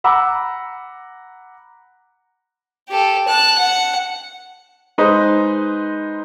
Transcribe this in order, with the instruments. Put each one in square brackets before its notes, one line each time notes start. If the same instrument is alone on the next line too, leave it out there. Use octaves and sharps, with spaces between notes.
[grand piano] F#5 A#5 B5 D6 E6
[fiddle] G4 A4
A5 F#6
F#5
[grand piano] G#3 D#4 B4 C5 D#5